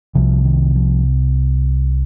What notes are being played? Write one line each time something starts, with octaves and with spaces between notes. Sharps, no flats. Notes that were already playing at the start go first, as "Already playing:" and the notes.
C2 C3 F3
D#3
F3